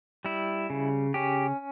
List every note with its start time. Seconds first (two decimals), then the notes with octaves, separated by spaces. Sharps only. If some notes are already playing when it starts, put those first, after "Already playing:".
0.25 G3 E4
0.70 C#3
1.14 C#4 G4